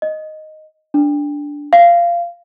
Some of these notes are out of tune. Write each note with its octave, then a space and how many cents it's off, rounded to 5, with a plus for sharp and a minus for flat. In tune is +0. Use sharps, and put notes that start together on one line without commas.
D#5 -5
D4 -10
F5 -15